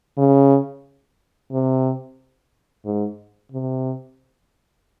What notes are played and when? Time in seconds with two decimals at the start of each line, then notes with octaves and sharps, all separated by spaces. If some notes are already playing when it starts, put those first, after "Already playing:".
0.18 C#3
1.52 C3
2.85 G#2
3.52 C3